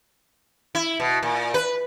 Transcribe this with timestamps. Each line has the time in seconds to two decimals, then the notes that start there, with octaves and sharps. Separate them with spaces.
0.75 E4
1.00 B2
1.23 A#2
1.54 B4